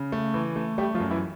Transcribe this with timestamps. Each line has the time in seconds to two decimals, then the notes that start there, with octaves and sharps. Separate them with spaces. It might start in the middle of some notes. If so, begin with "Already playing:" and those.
Already playing: C#3
0.12 A3
0.34 E3
0.56 A3
0.78 G3 A3 G4
0.94 F3 F4
1.00 F#2
1.11 E3 E4